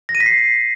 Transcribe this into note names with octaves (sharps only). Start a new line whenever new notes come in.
A#6
D#7
B6
C7